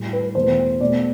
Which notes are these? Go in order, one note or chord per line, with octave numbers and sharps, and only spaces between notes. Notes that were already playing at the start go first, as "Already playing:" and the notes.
Already playing: A2 G3
B4
E2 B2 A3 C5
B2 A3 D5